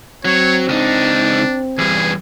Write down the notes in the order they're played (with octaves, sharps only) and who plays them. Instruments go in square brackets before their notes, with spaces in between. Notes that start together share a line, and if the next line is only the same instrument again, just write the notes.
[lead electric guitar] F#3 [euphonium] C4 [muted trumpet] C#5
[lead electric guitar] C#2 D#4 [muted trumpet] D4
[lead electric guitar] E2 G2 [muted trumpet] G#4